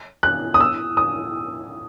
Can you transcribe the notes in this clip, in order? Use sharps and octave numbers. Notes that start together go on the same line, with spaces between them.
F#6
D#6
E6
D#6